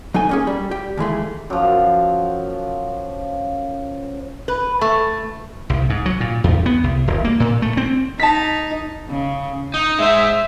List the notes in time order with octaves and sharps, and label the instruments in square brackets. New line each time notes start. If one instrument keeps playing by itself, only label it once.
[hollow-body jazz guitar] F#3 D#4 A4 G#5
A#3 C#4 G#4
G3
G4
D#2 E3 G#3 A3
[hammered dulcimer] F#2 F3
[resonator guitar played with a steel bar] B4
A3
[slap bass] C2
G#2
F#3
A#2
E2
B3
C2
D#1
A#3
A#2
A3
C4
[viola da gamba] D#4 [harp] A5 B6
[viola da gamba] C#3
[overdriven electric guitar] D#4
[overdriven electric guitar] G#3 C5 [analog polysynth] E5